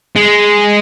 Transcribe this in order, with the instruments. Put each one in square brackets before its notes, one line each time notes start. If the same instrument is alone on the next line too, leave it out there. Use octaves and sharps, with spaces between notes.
[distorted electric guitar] G#3